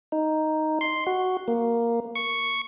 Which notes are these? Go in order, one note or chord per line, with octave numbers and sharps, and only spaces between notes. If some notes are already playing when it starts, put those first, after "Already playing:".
D#4
C6
F#4
A#3
C#6